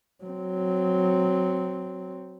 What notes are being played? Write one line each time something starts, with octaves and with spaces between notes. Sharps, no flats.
F#3 C4